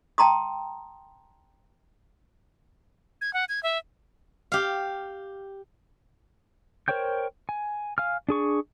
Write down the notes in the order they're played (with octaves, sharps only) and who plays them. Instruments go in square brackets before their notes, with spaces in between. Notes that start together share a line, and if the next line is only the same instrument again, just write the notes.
[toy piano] G5 A5 A#5 C6 D#6
[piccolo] G#6
F#5
G#6
E5
[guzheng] G4 F5
[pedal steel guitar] A#4 C5 C#5 G5 G6
G#5
F5 G#5 F6
D4 G#4 C#6